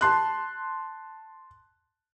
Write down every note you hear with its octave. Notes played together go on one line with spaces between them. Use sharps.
A5 C6 F#6